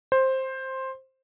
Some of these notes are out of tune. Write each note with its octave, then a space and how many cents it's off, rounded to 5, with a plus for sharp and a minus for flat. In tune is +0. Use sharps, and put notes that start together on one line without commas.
C5 +10